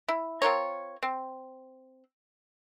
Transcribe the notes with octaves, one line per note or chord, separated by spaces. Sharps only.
E4
C4 F4 A#4 C#5
C4